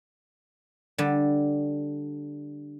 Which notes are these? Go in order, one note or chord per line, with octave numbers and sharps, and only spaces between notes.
D3 G3